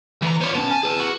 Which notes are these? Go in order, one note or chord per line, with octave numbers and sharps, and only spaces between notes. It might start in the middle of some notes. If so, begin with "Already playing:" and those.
D2 E3 A#5
B3 F4 C5 C#5
B3 C#4 A5
G#5
G#4 B4
F#4